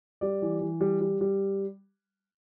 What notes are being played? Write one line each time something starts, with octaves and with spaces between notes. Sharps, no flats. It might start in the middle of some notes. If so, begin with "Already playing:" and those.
G3 D5
E3
E3
G3
G3
G3